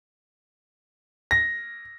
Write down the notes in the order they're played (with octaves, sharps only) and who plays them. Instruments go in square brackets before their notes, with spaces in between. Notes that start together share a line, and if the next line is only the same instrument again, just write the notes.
[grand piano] A#6